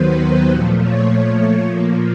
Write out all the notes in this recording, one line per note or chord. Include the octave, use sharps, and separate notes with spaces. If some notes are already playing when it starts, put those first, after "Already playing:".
Already playing: D#2 D#3 F#3 B3 B4 C5
A#2 F3 A3
C#5
A#2 F3 A#3